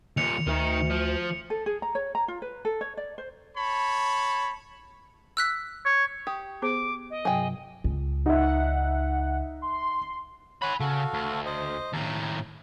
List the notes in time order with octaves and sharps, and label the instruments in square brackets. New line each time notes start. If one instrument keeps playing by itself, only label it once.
[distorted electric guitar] D#2 A#2 [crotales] C#7 F7
[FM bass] D2 [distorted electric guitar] D#3 D#4
[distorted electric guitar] F3
[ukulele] A4
G#4
A#5
C#5
A#5
F4
B4
A4
C#5
D5
C5
[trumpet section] C#5 A5 B5
[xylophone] E6 F#6 B6
[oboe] C#5
[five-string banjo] G4 [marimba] D#6
[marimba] B3 G#4 C5 [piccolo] D6
[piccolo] D#5
[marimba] G2 C3 F#3 [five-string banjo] G#4 G5
[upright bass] C#2
[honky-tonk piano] D#4 E5 [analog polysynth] F#5
[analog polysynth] C6
[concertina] C#5 F#5 C6 [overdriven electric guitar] G#5 B5
[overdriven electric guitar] C#3 [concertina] F#4 A4 F5
[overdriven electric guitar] D2
[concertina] C5 D#5
[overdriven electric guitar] D#2 A2 [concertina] A#5